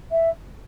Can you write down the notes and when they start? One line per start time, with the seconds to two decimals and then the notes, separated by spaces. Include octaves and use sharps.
0.11 E5